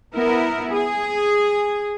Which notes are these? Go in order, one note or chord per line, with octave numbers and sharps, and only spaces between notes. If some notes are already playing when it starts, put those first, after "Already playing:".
B3 E4 A#4
G#4